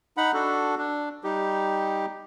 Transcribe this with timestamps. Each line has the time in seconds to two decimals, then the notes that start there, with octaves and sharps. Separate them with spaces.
0.17 D#4 F#5 B5
0.34 D4 F#4 A4
0.77 D4
1.24 G3 D#4 G4